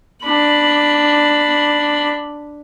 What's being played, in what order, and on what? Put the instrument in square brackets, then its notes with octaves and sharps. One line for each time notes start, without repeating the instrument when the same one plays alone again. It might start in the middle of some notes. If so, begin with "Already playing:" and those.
[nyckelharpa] D4 B5